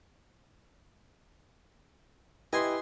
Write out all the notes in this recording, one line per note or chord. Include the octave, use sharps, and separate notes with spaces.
E4 G4 B4 D#5 G#5 C6